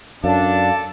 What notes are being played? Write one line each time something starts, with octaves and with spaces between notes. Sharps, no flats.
F#2 D4 A4 D5 F5 A5